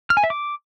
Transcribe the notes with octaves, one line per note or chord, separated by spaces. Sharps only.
F6
G#5
E5
D6